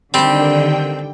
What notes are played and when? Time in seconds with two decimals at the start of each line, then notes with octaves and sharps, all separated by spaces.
0.14 D3 D#3 G3 C4 G4 G5